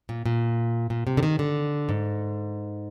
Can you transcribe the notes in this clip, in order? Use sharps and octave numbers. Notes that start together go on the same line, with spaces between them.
A#2
A#2
A#2
C3
D3
D#3
D3
G#2